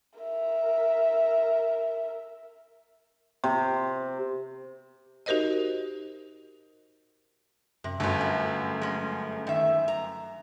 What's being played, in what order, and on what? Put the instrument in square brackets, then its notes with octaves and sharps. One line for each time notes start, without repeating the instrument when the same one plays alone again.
[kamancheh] A#4 E5
[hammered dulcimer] C3
[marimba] D#4 F#4 G4 A#4 C5 D#5
[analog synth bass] F#2 [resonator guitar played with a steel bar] C3
[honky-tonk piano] G1 F#2 [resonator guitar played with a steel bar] F#3 A4 [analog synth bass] A3
[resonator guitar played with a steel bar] A2
G#3 C#4
D#3 E5
A#5